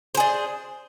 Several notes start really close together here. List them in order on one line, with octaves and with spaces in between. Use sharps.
C5 G#4 D4